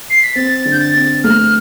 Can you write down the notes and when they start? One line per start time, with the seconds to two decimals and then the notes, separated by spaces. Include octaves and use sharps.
0.10 C7
0.22 B6
0.35 C4 A6
0.65 D3
0.72 G6
0.80 A6
0.94 C4
1.24 A3 F6